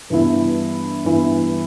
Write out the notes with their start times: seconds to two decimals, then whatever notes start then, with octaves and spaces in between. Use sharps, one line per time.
0.10 G2 E3 B3 E4
1.04 G2 E3 B3 E4